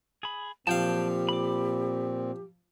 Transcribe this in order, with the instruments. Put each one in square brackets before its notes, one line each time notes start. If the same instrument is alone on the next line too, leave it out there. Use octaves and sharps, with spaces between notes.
[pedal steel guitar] G#4 B5
[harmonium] A#2 C4 [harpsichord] F3 F5 [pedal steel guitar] F#3 G5 A5 [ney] G4
[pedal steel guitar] B5 D6